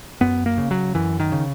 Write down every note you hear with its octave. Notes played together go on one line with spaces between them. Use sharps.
F#2 B3
A#3
C#3
F#3
F#2 E3
D#3
C#3